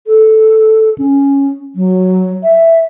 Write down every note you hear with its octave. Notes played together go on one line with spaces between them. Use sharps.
A4
C#4
F#3
E5